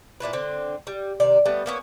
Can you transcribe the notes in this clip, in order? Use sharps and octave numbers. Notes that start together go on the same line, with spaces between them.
A#2 D4 E4 B4
D3 C4
G3
C3 D#3 D5
G3 A3 B3
A#3 B3 C#4